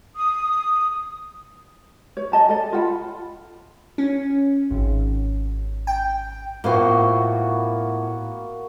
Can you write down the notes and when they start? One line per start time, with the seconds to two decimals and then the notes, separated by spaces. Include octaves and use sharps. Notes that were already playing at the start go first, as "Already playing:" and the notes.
0.15 D#6
2.17 C#5
2.32 D#5 A5 A#5
2.49 A4 D5 D#5
2.73 F4 F#5 B5
3.98 C#4
4.71 G#1
5.87 G5
6.64 A2 A#3 B3 F4 F#4 C5